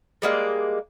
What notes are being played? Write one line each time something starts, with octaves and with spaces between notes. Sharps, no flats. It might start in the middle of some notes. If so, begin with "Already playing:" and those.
G3 G#3 A#3 D5